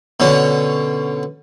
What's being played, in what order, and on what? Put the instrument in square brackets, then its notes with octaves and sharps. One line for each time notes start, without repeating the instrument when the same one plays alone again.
[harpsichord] B2 D3 C#4